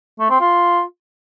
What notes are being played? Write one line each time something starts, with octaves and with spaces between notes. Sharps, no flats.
A3
C4
F4